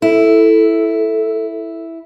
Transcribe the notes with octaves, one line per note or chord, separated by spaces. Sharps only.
E4 A4